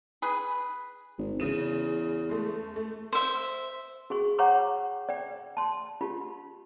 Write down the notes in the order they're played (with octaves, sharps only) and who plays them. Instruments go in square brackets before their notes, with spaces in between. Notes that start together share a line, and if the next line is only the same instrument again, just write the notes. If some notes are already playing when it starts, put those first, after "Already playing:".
[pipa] G#4 B4
[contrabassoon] G#1
[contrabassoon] E2 [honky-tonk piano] C#3 D#7 E7
[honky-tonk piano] G#3 A3
A3
[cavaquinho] C5 E5
[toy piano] F#4 G#4 C#6
C#5 F#5 G5 A#5 C#6 D6
D5 G5
A5 C6
F4 G4